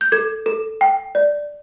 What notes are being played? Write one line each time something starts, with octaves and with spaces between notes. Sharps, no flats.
G6
A4 G#6
A4
G5
D5